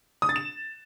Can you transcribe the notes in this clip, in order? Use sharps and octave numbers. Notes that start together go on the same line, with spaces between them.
D#6
A6
E7